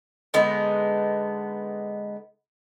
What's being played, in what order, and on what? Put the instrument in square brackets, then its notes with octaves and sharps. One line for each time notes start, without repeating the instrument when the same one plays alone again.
[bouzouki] D3 G#3 B3 D#4